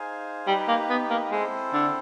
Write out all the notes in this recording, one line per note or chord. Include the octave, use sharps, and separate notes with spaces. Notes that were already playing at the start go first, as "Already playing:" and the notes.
Already playing: D#4 G#4 C5 F5 G#5
G3 D#4 G4 B4
A#3
B3
A#3
G#3 C4 E4 A4 C5
D3